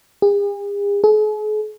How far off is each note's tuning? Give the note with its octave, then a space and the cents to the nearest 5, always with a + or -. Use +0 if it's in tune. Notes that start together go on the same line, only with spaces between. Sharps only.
G#4 -45
G#4 +45